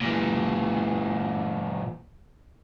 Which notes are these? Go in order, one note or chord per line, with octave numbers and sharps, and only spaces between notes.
A#2 E3